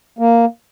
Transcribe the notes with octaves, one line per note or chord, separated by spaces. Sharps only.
A#3